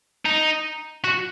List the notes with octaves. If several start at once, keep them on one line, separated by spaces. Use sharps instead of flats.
D#4
F#4